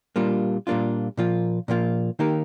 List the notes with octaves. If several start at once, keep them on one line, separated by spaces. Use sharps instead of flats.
A#2 G3 A#3 D4 F4
A#2 G3 A#3 D4 F4
A#2 F3 A#3 F4
A#2 F3 A#3 F4
D#3 A#3 D#4 G4 A#4